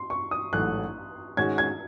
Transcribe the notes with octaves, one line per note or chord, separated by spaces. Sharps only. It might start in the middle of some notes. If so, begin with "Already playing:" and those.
Already playing: C6
C#6
D#6
A1 G#2 F#3 A3 F#6
G#2 D#3 G#3 C#4 F#4 G#6
G#6